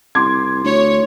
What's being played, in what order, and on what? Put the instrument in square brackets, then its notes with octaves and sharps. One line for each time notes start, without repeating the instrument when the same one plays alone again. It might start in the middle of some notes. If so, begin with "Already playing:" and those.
[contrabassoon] C2 [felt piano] C6 D6 G#6
[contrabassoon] D2 [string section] C#5